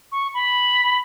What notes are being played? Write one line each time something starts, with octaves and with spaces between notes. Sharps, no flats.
C#6
B5